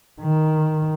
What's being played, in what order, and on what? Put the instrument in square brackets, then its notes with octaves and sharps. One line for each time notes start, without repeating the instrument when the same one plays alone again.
[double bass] D#3